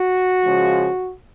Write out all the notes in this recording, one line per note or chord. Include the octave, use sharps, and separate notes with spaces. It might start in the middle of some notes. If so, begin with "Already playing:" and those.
Already playing: F#4
C#3 F3 G#3